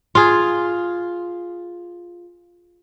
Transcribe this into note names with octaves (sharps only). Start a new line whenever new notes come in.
F4 G#4